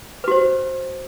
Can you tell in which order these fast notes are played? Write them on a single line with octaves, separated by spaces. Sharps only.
B4 F#4 C5